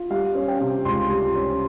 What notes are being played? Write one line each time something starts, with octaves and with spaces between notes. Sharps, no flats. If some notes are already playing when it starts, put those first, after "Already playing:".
Already playing: F4
G3 F5
C#4
G5
C3
C#2 C6
G3
C#4